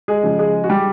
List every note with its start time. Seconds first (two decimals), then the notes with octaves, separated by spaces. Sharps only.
0.08 G#3 G#4
0.23 C#3 F3 G#3
0.39 G#3 G#4
0.64 F#4
0.70 G3 G4